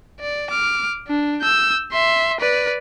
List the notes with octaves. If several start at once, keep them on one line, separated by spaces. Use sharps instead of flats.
D5
D6 F6
D4
E6 G6
E5 C6
B4 D5